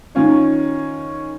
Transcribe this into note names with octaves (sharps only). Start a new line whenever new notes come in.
D#3 C#4 F4 C#5